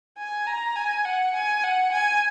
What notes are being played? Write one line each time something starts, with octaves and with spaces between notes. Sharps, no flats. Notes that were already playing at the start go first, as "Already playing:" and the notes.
G#5
A#5
G#5
F#5
G#5
F#5
G#5